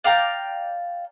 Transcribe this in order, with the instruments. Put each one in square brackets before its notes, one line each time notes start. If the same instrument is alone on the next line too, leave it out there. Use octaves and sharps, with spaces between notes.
[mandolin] D5 F5 G5 A#5